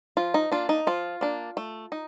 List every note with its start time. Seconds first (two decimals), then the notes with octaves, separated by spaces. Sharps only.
0.17 F3 F4
0.34 D#4
0.52 A#3 D4 F4
0.69 D#4
0.87 F3 F4
1.21 A#3 D4
1.57 A3
1.92 D#4